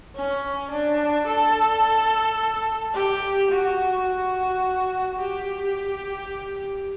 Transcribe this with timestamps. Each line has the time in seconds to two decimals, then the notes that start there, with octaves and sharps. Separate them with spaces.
0.16 C#4
0.71 D4
1.27 A4
2.94 G4
3.50 F#4
4.06 F#4
5.19 G4